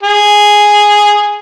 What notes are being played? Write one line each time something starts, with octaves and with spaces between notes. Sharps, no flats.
G#4